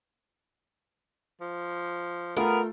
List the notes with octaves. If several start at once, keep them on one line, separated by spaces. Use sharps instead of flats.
F3
A3 B3 F4 G#4 A#4